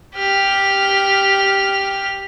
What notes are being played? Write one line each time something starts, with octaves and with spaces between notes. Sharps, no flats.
G4 F6